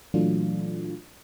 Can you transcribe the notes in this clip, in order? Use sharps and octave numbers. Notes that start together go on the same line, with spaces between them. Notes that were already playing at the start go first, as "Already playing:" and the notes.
A#2 E3 F#3 A3 D4 F4